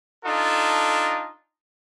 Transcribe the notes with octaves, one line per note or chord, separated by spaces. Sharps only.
D4 D#4 F4 A4